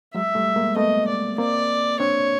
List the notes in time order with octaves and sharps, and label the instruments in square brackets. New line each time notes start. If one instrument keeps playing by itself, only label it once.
[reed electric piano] F#3 G#3 [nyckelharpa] E5
[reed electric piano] G3 A3
G#3 A#3
[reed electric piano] A3 B3 [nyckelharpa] D#5
[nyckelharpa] D5
[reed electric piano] A#3 C4 [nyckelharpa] D5
[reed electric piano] C4 D4 [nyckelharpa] C#5